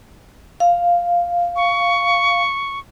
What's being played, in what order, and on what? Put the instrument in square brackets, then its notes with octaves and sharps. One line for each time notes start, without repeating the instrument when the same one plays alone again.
[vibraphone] F5
[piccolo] C#6